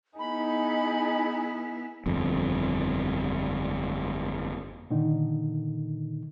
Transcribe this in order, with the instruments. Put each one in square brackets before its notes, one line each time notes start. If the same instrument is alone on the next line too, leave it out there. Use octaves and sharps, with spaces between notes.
[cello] B3 E4 [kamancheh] D#4 G#4 [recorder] B5
[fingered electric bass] G1 F2
[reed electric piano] A#2 D3 D#3 D#4